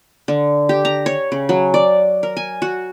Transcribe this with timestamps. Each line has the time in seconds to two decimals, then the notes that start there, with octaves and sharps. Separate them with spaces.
0.28 D3
0.69 G4
0.85 A#5
1.06 C#5
1.32 C#3
1.49 F#3
1.74 D5
2.23 A#4
2.37 G#5
2.62 F#4